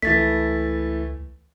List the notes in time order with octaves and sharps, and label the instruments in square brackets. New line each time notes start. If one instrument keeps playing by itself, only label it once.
[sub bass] C#2 [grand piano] E3 A3 [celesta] A6 B6